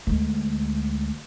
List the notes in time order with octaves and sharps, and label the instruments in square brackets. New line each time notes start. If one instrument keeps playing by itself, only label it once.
[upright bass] D2 G#3